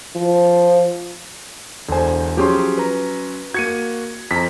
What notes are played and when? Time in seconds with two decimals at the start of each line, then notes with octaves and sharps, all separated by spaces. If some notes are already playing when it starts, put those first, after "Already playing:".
0.16 F3
1.88 E1 D3 C5 G#5
2.37 F3 F#3 C#4 G4 G#4 C6
2.78 B4 A#5
3.54 A#3 F#4 G#6 C#7 D#7
4.31 F2 A#5 B6